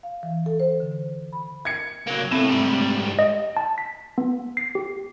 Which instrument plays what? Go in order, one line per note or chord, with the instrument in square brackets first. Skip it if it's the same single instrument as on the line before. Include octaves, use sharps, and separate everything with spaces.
[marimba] F5
E3
A4
C5
D3
B5
[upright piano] G#6 C#7
[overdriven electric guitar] F#3 A#3
[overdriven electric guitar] A2 [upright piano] C3 A3 E7
[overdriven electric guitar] G#2 G3
[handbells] D#5
A5
B6
B3
C7
G4